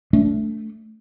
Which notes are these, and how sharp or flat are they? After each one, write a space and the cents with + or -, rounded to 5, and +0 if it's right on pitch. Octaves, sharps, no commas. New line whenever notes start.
A3 +0 D4 -30